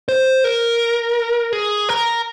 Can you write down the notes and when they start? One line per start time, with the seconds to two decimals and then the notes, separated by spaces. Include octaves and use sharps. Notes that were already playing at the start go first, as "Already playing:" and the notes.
0.08 C5
0.44 A#4
1.53 G#4
1.89 A#4